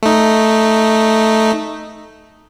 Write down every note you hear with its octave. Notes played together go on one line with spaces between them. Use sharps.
A3 D#4